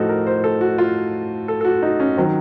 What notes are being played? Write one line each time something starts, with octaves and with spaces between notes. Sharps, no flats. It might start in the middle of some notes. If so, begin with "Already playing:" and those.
Already playing: A2 F3 D#4 F#4 A4
A#4
C5
A4
F#4
F4
A4
A4
F#4
D#4
C#4
D#3 F#3 C4